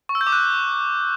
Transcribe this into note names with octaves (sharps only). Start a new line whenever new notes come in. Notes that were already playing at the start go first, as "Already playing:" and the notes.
C#6
E6
G6
D6
F#6